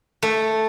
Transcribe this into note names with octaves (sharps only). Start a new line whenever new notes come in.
A3